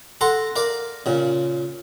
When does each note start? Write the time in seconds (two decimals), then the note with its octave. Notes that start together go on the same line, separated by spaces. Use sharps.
0.21 A4 F#5 A#5 C6
0.56 A#4 D5 F5
1.06 A#2 C#3